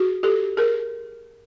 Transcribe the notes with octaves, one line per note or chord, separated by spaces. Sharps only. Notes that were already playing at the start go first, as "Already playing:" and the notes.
Already playing: F#4 G#4
G4 A4
G#4 A#4